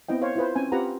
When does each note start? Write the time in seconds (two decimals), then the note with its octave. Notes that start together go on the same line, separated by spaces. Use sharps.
0.09 B3 C4 E4 D#5 G5
0.21 A#4 C5 C#5 F5
0.36 E4 F4 B4 C5
0.56 C4 C#4 G#5
0.72 C4 F4 G4 B4 F#5 A#5